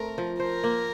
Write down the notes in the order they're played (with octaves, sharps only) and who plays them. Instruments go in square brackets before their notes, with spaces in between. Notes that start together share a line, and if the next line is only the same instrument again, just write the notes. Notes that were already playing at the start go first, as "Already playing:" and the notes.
Already playing: [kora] A3 C4 [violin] A#4
[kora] F3
[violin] A#4 [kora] C5
[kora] A#3